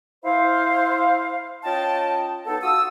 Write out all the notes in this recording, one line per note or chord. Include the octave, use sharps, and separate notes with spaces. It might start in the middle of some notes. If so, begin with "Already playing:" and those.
E4 C5 F5
C#4 F4 D#5 G5 A5
F#3 B3 D#4 A4
F4 F#4 D#6 E6